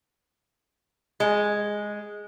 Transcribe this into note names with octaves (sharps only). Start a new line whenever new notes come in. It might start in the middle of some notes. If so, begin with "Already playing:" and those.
G#3